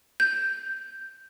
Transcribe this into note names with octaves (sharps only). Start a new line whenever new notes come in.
G6